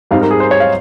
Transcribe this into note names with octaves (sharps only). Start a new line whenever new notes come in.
G#2 G3 C4 D#4 F5
A#4
G#4
C5
C#5
F5